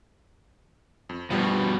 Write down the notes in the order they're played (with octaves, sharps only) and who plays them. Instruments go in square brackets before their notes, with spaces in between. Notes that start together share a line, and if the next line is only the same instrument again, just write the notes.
[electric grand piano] F2
[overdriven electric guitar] G2 B2 [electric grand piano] F3 G3